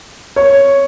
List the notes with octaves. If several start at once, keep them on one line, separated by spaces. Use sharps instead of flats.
C#5